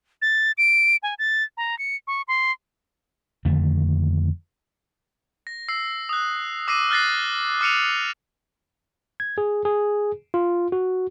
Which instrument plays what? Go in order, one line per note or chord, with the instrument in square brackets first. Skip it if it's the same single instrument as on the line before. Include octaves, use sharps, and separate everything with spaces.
[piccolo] A6
D7
G#5
A6
A#5
C#7
C#6
C6
[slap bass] F2 D3 D#3 A3
[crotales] A#6
E6 C7
D#6 F#6
D6 E6 A#6 C7 D#7
F6 F#6 A6 A#6 C7
D6 F6 C#7 D#7 F7
[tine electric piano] G#6
G#4
G#4
F4
F#4